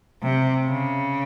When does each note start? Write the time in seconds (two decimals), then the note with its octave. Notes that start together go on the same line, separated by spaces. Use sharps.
0.22 C3
0.65 C#3